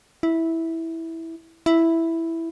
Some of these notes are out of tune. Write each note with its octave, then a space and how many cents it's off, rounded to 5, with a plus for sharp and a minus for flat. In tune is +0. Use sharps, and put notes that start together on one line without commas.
E4 -10
E4 +0